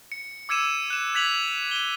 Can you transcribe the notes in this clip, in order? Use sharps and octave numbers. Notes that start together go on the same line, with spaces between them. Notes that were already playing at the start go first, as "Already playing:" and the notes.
C#7
D6 E6 G#6 C#7 D#7 E7
F#6 E7
F#6 G#6 B6 F7 F#7
D#7 G7